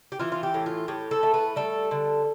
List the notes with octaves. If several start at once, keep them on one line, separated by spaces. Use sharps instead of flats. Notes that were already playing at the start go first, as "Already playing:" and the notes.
G4
E3 F4
F4
G4
A2
F4
A2 G4
A4
A3
B4
G3 A4
D3